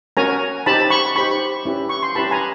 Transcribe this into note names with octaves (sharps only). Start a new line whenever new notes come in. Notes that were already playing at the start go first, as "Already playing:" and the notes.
C#4 F#4 A#4 C#5 G#5 A#5
D#4 G4 C5 A5 B5
B5 C#6
D#4 G4 C5 B5 C#6
C#4 E4 G4 B4
C#6
C6
C#4 E4 G4 B4 A5 B5
G#5 A#5